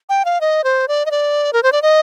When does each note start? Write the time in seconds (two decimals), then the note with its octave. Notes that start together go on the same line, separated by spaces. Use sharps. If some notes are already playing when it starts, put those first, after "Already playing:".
0.09 G5
0.25 F5
0.41 D#5
0.64 C5
0.88 D5
1.06 D#5
1.11 D5
1.53 A#4
1.63 C5
1.72 D5
1.82 D#5